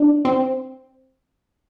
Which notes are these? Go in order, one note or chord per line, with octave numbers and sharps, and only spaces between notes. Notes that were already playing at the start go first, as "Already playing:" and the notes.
Already playing: D4
C4